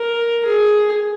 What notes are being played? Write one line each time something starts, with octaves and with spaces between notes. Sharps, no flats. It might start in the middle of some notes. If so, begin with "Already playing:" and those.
Already playing: A#4
G#4